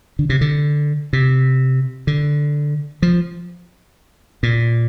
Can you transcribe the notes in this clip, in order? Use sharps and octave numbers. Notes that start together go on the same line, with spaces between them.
D3
C3
D3
C3
D3
F3
A#2